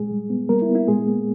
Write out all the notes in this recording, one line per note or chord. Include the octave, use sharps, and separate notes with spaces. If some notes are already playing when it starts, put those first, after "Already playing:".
Already playing: A#2 G#3 G#4
G3
B3
G3 A#3 A#4
E4
B3
E4
A#2 G#3 G#4
A#3